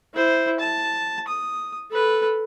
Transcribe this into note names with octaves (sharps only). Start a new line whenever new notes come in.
E4 C5
A5
D#6
A4 B4